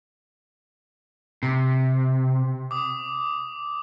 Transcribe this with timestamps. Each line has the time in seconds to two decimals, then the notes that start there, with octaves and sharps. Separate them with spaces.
1.43 C3
2.71 D6 D#6